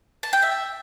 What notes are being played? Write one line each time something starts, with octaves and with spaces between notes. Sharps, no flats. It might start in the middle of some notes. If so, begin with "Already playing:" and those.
A5
G5
E5